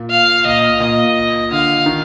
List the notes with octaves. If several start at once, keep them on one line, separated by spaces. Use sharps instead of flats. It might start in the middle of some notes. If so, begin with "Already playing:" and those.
Already playing: A#2
F5
A#2 D#5
A#2 D#5
D3 F5
D#3